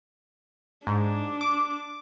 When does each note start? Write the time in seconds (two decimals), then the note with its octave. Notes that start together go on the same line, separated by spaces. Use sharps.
0.87 G#2 D4
1.41 D6